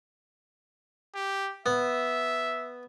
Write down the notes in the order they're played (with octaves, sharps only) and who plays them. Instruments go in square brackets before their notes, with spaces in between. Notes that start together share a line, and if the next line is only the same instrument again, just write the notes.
[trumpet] G4
[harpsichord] B3 [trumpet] E5